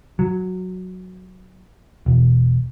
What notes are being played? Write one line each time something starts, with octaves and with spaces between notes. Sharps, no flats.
F#3
E1